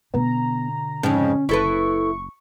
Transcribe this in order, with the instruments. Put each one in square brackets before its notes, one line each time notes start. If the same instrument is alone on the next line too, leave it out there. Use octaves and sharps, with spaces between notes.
[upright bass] B2 D3 [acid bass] B3 [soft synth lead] A#5
[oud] F2 C#3 [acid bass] G#2 [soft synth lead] C#4
[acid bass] F#1 [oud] E4 A4 B4 [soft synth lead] C#6